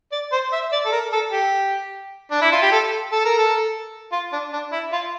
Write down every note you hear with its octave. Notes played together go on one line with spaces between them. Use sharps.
D5
C5
E5
D5
A4
A#4
A4
G4
D4
E4
F4
G4
A4
A4
A#4
A4
F4
D4
D4
E4
F4